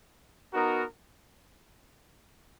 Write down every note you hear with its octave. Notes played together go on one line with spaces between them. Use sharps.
B3 D#4 F#4 A#4